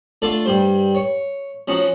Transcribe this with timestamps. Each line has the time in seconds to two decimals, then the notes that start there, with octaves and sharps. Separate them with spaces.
0.22 D3 A3 F4 D5 A5
0.45 G2 G3 C5
0.95 C#5
1.68 F3 C#4 D#4 F#4